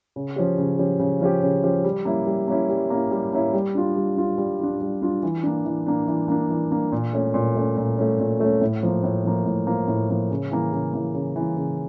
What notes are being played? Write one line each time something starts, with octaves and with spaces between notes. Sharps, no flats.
C#3
F3 C#4 G4
C#3
F3 C#4 G4
C#3
F3 C#4 G4
C#3
F3 C#4 G4
G3
A#3 C#4 E4
G3
A#3 C#4 E4
G3
A#3 C#4 E4
G3
A#3 C#4 E4
G3
D4 F4
G3
D4 F4
G3
D4 F4
G3
D4 F4
E3
A#3 D4
E3
A#3 D4
E3
A#3 D4
E3
A#3 D4
A#2
A3 C#4
A#2
A3 C#4
A#2
A3 C#4
A#2
A3 C#4
A2
F3 A#3
A2
F3 A#3
A2
F3 A#3
A2
F3 A#3
C#3
E3 A#3
C#3
E3 A#3
C#3
E3
A#3
C#3